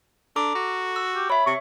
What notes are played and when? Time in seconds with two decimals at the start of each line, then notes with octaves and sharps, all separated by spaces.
0.36 D4 A4 A#5 D6
0.55 F#4
0.96 E6
1.15 G4
1.30 C#5 E5 B5
1.46 C3 C#6